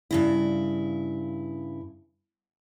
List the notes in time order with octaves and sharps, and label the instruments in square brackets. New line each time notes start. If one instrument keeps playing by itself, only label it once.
[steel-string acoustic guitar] G2 C#3 E4